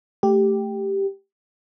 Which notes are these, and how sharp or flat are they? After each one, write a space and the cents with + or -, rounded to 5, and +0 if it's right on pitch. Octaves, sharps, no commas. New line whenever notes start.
A3 +0 G4 +0